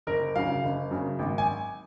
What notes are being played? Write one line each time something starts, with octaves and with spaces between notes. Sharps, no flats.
F#1 A#4
F#2 C#3 F5
F#1
F#2 C#3
G#1
G#5